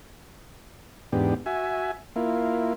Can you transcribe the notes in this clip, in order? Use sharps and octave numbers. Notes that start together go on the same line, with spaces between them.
E2 G#2 B3 D4 G4
F#4 E5 G#5
A#3 E4 F4